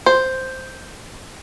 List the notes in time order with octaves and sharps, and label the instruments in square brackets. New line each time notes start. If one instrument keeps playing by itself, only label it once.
[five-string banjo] C5